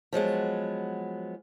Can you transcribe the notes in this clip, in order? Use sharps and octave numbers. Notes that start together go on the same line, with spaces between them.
F3 F#3 G#3 B3